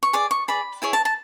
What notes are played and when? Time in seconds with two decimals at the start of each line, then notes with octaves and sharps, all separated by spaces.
0.03 C#6
0.13 G#4 D5 D6
0.31 C#6
0.48 G#4 D5 B5
0.82 E4 G#4 C#5 G#5
0.93 A5
1.05 A5